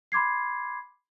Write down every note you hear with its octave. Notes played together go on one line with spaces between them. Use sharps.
B5 C6 D6 G#6 C7